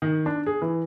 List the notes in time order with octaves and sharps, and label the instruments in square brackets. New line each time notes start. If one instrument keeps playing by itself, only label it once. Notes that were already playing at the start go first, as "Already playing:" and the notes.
[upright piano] D#3
D4
G#4
E3